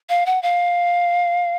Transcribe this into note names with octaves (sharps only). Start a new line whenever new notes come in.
F5
F#5
F5